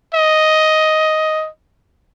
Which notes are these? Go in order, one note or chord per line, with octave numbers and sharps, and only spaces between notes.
D#5